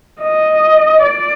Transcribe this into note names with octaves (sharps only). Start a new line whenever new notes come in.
D#5
D5